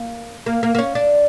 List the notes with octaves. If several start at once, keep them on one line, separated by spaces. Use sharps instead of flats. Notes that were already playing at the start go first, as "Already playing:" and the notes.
Already playing: A#3
A#3
A#3
A#3
C#4
D4